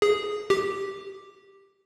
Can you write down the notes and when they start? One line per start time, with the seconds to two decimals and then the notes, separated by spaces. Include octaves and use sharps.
0.02 G#4
0.50 G4